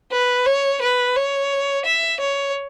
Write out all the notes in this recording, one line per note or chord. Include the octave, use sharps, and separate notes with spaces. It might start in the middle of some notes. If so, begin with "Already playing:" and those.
B4
C#5
B4
C#5
E5
C#5